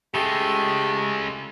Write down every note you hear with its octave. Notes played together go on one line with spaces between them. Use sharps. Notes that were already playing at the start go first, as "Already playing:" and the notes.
C#3 G#3 A3 G4